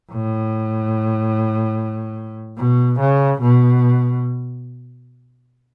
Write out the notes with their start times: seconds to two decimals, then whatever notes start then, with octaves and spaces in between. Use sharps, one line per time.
0.11 A2
2.58 B2
3.00 C#3
3.41 B2